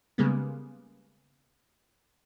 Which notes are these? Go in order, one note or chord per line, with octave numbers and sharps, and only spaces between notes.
C#3 G3 G#3 A#3 B3